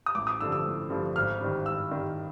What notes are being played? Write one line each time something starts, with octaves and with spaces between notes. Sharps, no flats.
D#6
A1 D6
D#6
G2 D3 F3 E6
E6
A1
G2 D3 F3
G#1 F6
G2 D#3
G#1 E6
G2 D#3